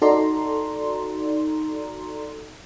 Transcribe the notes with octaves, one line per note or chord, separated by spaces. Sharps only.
D#4 F#4 A4 D5 A#5 C6